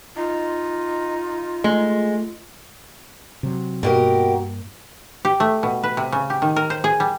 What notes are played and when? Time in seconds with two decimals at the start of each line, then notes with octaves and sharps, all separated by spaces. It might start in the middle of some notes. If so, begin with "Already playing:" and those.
0.16 D#4 F4
1.64 G#3 A3
3.43 C3 F#3
3.83 G2 B2 A#3 G4 A#4
5.25 G4
5.40 A3
5.63 B2
5.83 B4
5.97 C3
6.12 C#3
6.30 G4
6.42 D#3
6.56 A#4
6.70 C5
6.84 G#4
7.00 G3